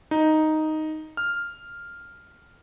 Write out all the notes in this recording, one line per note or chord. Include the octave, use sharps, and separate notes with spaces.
D#4
F6